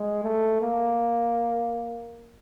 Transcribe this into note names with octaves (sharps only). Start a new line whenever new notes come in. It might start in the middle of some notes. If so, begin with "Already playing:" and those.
Already playing: G#3
A3
A#3